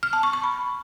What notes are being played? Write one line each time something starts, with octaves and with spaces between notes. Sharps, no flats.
F6
A5
C#6
C#6
B5